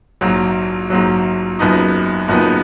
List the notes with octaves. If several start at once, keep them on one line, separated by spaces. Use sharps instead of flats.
A#1 G#2 F#3
A#1 G#2 F#3
F#1 F#2 F3 B3 D#4
F#1 F#2 F3 B3 D#4